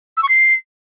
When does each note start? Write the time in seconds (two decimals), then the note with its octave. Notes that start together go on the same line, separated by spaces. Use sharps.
0.17 E6
0.23 C#6
0.29 C7